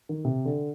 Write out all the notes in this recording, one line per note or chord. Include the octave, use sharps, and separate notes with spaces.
D#3
C3
D3